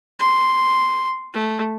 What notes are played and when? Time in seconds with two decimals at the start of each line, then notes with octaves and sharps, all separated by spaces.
0.19 C6
1.34 A3